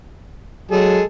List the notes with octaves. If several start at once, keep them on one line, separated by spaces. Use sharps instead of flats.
F#3 G#3 G#4 A4